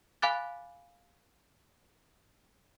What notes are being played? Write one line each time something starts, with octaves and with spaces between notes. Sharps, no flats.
F5 G#5 B5 D6 F#6 A6